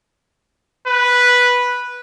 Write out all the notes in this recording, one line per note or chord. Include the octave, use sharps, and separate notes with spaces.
B4